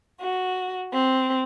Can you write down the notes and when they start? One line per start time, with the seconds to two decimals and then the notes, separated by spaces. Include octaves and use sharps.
0.21 F#4
0.93 C4